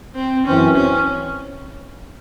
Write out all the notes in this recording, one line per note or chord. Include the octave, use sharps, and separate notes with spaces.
C4
F#2 E3 C4 C#4
C#4